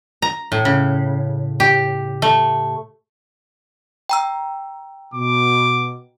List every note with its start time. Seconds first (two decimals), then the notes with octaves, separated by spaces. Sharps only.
0.22 A#5
0.52 A2
0.65 C#3
1.60 G4
2.22 A3
4.09 G5 A#5 E6
5.14 B2 D6